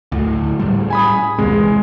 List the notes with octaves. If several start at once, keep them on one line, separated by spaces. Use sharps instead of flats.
D2 A2
A2 G3
G#5 B5 D#6
A#1 D#2 C3 G#3
E2